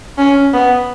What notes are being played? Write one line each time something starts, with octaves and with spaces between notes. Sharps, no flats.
C#4
B3